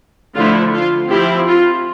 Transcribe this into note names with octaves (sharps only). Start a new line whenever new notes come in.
D3 F3 A3 E4 F4
F4
F3 C4 E4 G4
F4